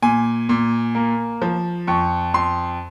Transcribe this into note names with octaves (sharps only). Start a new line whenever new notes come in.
A#2 G#5
A#2
A#3
F3
F2 C#6
F2 C6